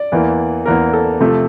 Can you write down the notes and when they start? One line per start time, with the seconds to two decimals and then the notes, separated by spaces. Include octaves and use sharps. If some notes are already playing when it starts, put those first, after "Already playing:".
Already playing: D5
0.12 E2 E3 A#3
0.65 E2 E3 A#3 A#4
0.93 A4
1.20 C3 F3 A3